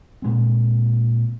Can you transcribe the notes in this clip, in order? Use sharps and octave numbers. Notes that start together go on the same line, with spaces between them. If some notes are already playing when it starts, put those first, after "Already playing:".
A#2 G#3 C4